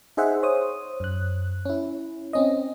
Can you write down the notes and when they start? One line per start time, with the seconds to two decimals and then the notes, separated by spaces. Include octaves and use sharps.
0.17 D#4 G#4 C5 E5 F#5
0.43 C5 C#5 D#6
1.00 F#2 F#6
1.65 C#4 E4
2.33 C4 C#4 D#5